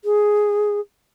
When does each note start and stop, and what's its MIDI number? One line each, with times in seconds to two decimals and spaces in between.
0.04 0.80 68